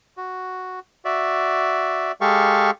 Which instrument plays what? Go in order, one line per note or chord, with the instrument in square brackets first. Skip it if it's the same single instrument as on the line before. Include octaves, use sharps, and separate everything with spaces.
[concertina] F#4
F#4 D5 E5
G#3 G4 A4 F5 C#6